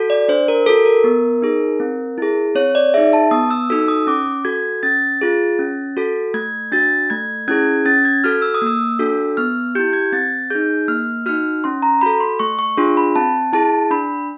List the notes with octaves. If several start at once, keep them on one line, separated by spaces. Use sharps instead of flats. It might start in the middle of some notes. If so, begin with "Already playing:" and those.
Already playing: F#4 A4
D5
D4 C5
A#4
F#4 A4
A#4
B3
D#4 G#4
C4
E4 G#4
C4 C#5
D5
D#4 G#4 E5
A5
B3 D#6
E6
D#4 F#4 A4 E6
D#6
C#4 D6
F#4 A4 G#6
C#4 A6
F4 G#4
C#4
F#4 A4
A3 G#6
D4 F#4 A6
A3 G#6
C#4 E4 G#4 G#6
C#4 A6
G#6
F#4 A4 F6
E6
D#6
A#3 E6
D4 F#4 A4
B3 F6
E4 G4 G6
G#6
C4 A6
D#4 G#4 G6
A#3 F6
D#4 F#4 F6
C#4 C6
A#5
F#4 A4 B5
C6
A3 C#6
C#6
D4 F4 G#4 C6
B5
C4 A5
E4 G#4 A5
D4 B5